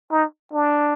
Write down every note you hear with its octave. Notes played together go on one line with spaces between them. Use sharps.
D#4
D4